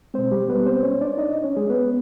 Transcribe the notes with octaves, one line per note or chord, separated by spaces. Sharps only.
B2 G#3 C4 C5
G3 G4
B3 B4
C4 C5
C#4 C#5
D4 D5
D#4 D#5
C#4 C#5
G#3 G#4
B3 B4